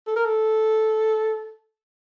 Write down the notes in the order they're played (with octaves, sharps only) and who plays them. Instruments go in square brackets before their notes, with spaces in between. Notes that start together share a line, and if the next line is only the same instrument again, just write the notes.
[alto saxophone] A4
A#4
A4